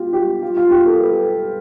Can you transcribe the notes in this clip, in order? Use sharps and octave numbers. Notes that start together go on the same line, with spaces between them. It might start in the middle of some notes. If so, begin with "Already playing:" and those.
Already playing: F4 G4
G4
F4
F4
G4
A4
B4